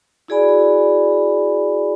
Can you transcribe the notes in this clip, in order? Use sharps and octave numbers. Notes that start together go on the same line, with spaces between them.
E4 F#4 G#4 D5 G#5 B5